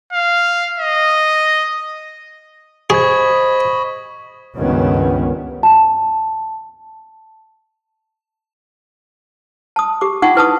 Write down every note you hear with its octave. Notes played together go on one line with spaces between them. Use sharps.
F5
D#5
G#4 C5 D#5 B5 C#6 G#6
C#2 G2 D#3 B3 C#4
A5
A5 D#6
G4 D6
D#4 F4 F#5 G5 C#6
E4 B4 A5 D#6